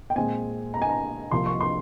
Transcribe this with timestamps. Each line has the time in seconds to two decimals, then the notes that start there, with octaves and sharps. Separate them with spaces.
0.10 G5
0.16 A#2 G#3 C4 G#5
0.74 A#5
0.82 G#5
0.89 A#5
1.31 C2 C3 F3 A#3 C6
1.46 C#6
1.61 C6